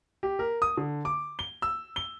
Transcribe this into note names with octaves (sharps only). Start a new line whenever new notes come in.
G4
A#4
D#6
D3
D6
G7
E6
G7